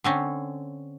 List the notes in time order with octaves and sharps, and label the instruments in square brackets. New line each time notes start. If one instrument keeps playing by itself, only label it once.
[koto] D3 C4 C#4